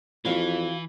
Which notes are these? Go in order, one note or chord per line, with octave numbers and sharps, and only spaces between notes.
F2 E3 E4 F#4 F5